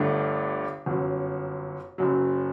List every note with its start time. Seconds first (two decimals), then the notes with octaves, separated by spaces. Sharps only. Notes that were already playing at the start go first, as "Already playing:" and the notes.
Already playing: G1 G2 D3 A3 D4
0.86 G1 F#2 F#3
1.98 F#1 F#2 F#3